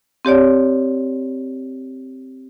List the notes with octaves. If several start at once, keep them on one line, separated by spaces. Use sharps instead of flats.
C4 G4 C#5 D5